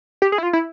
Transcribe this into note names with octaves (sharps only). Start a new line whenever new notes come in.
G4
G#4
E4
F4
E4